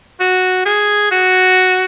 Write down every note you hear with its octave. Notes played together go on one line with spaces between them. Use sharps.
F#4
G#4
F#4